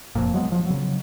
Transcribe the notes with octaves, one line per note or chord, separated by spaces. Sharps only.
F1 F2 A#2
F#3 G#3 B3
F3
C#3 F#3